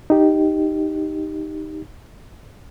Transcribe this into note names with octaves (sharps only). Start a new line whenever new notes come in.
D#4 G4